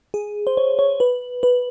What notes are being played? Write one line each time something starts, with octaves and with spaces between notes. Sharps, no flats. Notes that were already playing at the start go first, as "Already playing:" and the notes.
G#4
C5
C#5
C#5
B4
B4